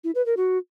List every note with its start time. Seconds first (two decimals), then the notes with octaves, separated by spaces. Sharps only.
0.04 E4
0.15 B4
0.26 A#4
0.37 F#4